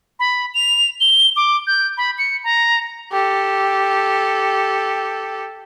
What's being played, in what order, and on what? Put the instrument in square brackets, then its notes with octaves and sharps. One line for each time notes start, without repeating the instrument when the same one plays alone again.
[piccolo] B5
F7
G7
D6
G6
B5
C#7
A#5
[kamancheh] G4 A4